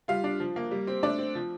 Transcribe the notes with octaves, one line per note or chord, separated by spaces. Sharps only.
G3 F4 F5
D4
F3
A#3
G3
C4
A3 D4 D5
C4
F3